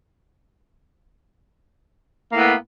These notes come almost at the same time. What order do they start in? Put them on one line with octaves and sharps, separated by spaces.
A#3 A2 B3